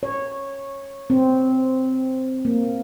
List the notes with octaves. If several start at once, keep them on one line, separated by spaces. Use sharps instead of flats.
C#5
C4
A#3